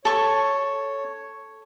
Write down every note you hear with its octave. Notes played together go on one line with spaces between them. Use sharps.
A4 C#5 C#6